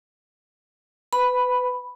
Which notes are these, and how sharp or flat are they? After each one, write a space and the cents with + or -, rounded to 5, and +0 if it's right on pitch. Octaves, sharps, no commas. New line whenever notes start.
B4 +25 B5 +0